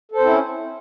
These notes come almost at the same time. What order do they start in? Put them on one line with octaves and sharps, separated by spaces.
A4 C5 C4 E4 C#4